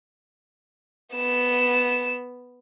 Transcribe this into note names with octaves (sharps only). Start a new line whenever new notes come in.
B3 E7